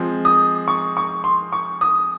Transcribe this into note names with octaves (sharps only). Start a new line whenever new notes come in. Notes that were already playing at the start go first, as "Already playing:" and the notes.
Already playing: F3 G#3 C4
D#6
C#6
C#6
C6
C#6
D#6